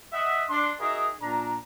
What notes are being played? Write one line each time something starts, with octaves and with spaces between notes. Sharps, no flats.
D#5 E5 F#5
D4 C6
D#4 F#4 G#4 A#4 E5
A#2 D4 A#5